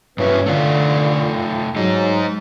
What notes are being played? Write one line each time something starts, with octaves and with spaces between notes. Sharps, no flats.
G2 F#3 C#4 E4 B4
D3 A3 F4
F#3 G#3 D#4